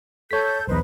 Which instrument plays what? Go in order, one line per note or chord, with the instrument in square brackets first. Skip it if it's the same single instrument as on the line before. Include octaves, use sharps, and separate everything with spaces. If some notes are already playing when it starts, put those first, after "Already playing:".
[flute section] A4 G6 [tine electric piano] C#5 B6
[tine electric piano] B1 E2 [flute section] D#4 B4 C5